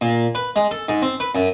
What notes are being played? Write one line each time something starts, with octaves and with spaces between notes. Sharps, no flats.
A#2
B4
G#3
A4
G#2
C4
B4
F#2